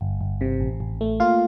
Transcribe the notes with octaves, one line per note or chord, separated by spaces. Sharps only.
G1
G1
C3
A1
A1
A3
A#3 F4 F5